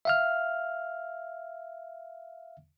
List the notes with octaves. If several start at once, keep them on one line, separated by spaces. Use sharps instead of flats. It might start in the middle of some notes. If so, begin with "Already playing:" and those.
E5 F5 F6